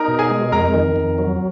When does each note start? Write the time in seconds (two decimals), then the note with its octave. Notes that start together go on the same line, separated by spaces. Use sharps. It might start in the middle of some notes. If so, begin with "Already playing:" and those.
Already playing: D#4 A#4 A#5 D#6
0.08 B2
0.19 G#4 G#5
0.30 G#3
0.52 F2 A#4 A#5
0.74 D#3
0.96 F2
1.18 F#3